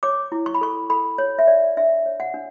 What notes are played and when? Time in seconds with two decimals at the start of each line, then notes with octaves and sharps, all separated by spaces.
0.03 C#5 D6
0.32 E4
0.46 C#6
0.54 B5
0.61 A4 C#6
0.90 A4 B5
1.18 C#5
1.39 E5
1.47 C#5 D5
1.77 D4 E5
2.06 C#5
2.20 F#5
2.34 D4